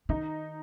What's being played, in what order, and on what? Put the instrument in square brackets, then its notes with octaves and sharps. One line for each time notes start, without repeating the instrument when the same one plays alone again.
[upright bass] D#3 [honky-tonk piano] D#4